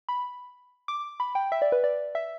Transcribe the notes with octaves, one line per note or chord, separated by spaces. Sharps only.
B5
D6
B5
G5
E5
D5
B4
D5
E5